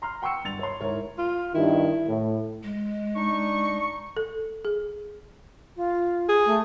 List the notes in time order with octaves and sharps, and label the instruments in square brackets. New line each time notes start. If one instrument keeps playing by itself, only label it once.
[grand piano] A#5 C6 F6
F#5 G5 C6 C#6 E6 C#7
G2 A6 F7
C#5 C6
G#2 E4 A#4 C#5
[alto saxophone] F4
[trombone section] G2 D#3 [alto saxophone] E4
[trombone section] A2
[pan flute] G#3
[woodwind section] D4 D#4 C#6
[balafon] A4
G#4
[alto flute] F4
[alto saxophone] G#4
[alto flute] A3